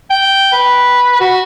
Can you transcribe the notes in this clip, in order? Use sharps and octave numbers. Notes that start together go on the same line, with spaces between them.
G5
B4
F#4